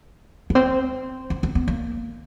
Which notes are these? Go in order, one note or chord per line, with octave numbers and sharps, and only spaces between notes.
B3
C4
C4
C4
B3
A#3